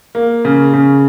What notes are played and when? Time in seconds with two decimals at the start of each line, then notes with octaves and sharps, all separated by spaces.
0.15 A#3
0.45 C#3
0.73 C#3